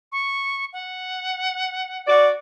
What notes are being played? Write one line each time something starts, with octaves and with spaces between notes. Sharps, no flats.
C#6
F#5
F#4 D5